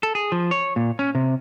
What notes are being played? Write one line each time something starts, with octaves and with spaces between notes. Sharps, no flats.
A4
G#4
F3
C#5
A#2
C#4
C3